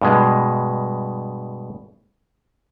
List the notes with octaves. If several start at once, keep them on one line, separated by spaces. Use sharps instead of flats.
G2 B2 G#3